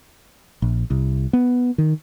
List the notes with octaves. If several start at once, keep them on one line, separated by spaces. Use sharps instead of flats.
A#1
C2
B3
D#3